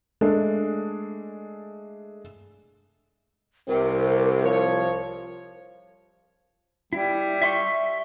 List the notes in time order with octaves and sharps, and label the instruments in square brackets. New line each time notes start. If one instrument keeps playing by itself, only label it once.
[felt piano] G#3 A3 D4 A4
[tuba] C2 [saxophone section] C3 [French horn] C4 [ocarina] A#4
[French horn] F3 [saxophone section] C#5
[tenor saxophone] G3 [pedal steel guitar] E4
[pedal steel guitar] E5 C6 C#6